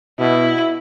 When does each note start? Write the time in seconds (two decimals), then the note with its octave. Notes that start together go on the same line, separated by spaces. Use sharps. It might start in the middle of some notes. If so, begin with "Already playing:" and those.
0.19 B2 E4